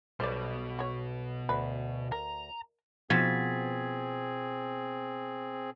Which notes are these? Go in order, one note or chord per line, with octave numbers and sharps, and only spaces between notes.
B1 B2 G3 C5 D5
F#4 C#5
D2 B4
A#4 A#5
B2 F3 B3 C4 G#4 G#6 A6 B6